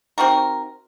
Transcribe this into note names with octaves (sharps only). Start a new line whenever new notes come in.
C4 D#4 F#4 A#4